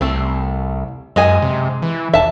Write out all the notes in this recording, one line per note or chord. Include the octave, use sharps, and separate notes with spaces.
C2 A3 C4
F#2 G#3 D#5 G#5
C3
E3
E1 E5 A5